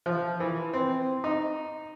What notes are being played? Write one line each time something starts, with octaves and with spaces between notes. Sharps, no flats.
F3
E3
C4
D#4